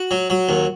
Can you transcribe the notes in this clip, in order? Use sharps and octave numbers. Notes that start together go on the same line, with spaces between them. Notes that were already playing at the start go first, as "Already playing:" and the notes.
Already playing: F#4
F#3
F#3
D#2